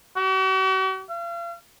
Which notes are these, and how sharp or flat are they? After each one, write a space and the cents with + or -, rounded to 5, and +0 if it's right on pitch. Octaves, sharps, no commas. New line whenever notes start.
F#4 +45
F5 -40